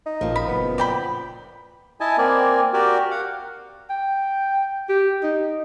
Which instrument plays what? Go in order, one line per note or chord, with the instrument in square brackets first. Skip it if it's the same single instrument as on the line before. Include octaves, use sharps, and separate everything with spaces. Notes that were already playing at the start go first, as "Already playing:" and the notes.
[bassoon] D#4
[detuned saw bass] A1 [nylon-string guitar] A#2 F3
[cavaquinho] B5
[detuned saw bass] F#1 [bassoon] B3
[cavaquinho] D5 G5 B5
[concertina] E4 D#5 G#5 A5
A#3 C4 A#4 D5 G#5
F#4 G4 A#4 D5
F5 F#5
[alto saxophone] G5
G4
D#4